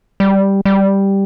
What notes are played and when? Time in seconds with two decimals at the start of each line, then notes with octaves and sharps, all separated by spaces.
0.20 G3
0.65 G3